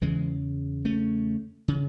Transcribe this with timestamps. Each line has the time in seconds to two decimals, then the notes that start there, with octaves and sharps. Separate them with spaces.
0.01 E2 C#3 E3 G#3
0.85 A3 C#4
1.68 C#3